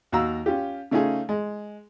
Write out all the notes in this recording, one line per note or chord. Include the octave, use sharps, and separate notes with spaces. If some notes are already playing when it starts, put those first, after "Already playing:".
D#2 F#4 F5 A#5 E6
C#4 F4 G4
C#3 A3 C#4 D#4 F4 G#4
G#3